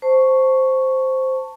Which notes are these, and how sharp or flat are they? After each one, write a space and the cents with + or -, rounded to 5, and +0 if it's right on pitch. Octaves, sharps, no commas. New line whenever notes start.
C5 +0 A5 +20 C#6 +0